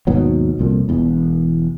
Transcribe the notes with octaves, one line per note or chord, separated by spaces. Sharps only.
D#2 G#2 B2 F#3
C2 F2 A#2
E1 E2